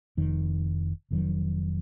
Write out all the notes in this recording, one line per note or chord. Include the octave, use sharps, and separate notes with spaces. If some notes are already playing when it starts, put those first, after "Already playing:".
F1 F2 D#3
F1 F2 D#3 F#3